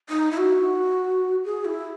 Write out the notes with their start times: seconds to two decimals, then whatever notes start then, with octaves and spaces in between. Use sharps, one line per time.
0.10 D#4
0.31 E4
0.38 F#4
1.45 G#4
1.65 E4